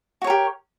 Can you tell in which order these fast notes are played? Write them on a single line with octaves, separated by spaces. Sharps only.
F#4 C#5 A#4 G4